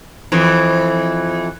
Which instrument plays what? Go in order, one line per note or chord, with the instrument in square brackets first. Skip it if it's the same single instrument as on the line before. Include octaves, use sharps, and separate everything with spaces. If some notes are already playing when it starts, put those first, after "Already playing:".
[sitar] F2 E3